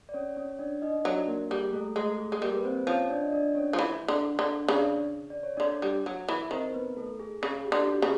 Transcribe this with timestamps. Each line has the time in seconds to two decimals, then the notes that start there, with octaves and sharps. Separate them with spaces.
0.09 D5
0.14 C#4 C#5
0.36 C#4 C#5
0.59 D4 D5
0.82 D#4 D#5
1.05 F#3 D4 D5
1.28 A#3 A#4
1.50 G3 G#4
1.73 A3 A4
1.96 G#3 A3 A4
2.19 G#4
2.32 G#3
2.41 G3 A#3 A#4
2.55 B4
2.64 C4 C5
2.87 F3 C#4 C#5
3.10 D4 D5
3.21 D#5
3.32 D4 D5
3.55 C#4 C#5
3.73 F3
3.79 E3
4.08 D3
4.39 D3
4.68 C#3 D4 D5
5.30 D5
5.43 C#5
5.57 D3 D4 D5
5.82 G3
6.06 F#3
6.29 E3
6.51 D#3 C4 C5
6.74 B3 B4
6.97 A3 A4
7.20 G#4
7.42 C#3 G#4
7.65 G4
7.72 D3
7.82 G4
7.88 F#4
8.02 C#3